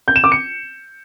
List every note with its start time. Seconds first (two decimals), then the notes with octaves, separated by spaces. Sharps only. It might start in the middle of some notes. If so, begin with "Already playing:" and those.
0.08 G6
0.16 E7
0.24 D6
0.32 C#7